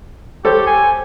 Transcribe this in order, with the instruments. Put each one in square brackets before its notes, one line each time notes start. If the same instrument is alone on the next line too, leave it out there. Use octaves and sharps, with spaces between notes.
[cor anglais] G4 [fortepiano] A4 C5 C#5
[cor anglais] G#5